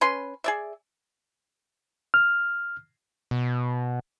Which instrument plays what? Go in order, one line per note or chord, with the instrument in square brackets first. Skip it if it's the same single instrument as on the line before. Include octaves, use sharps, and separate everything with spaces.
[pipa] C#4 B4 C6
G#4 D5 E5
[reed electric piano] F6
[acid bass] B2